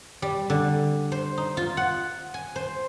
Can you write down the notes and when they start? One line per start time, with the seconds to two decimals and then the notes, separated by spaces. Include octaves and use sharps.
0.22 G3
0.50 D3
1.12 C5
1.38 D#4
1.57 F4
1.77 F#5
2.34 G#5
2.56 C5